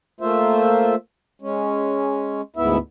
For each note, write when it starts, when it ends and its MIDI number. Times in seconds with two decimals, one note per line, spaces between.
0.21 0.95 57
0.21 0.95 58
0.21 0.95 65
0.21 0.95 72
0.21 0.95 76
1.42 2.41 56
1.42 2.41 61
2.56 2.78 38
2.56 2.78 44
2.56 2.78 59
2.56 2.78 64
2.56 2.78 76